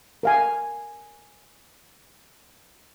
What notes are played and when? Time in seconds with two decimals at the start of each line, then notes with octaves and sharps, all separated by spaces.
0.23 A#4 F5 G#5